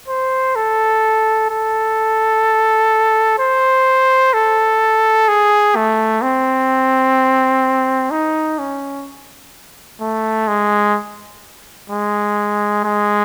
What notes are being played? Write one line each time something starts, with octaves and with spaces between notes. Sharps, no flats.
C5
A4
A4
C5
A4
G#4
A3
C4
D#4
C#4
A3
G#3
G#3
G#3